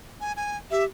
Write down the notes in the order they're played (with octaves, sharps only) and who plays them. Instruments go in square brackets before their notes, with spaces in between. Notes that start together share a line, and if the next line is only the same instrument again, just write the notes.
[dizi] G#5
G#5
[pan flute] G4 [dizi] E5